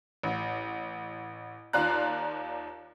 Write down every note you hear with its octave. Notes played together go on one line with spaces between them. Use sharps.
A1
D#2 F4 D5 A#5 F#6